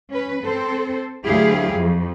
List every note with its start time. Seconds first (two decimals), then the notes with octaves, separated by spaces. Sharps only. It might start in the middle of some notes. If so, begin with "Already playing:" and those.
0.10 C#4 B4
0.44 C4 A4 C5
1.26 D2 F#3 E4 G4 G#4 F5
1.76 F2